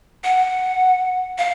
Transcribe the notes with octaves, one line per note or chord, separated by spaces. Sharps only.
F#5
F5